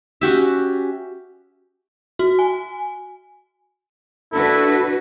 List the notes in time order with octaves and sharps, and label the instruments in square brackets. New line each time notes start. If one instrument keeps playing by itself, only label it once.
[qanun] C#4 F#4 G4 E5
[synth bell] F#4
G#5
[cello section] D4 F#4 B4 [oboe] E4 [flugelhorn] A4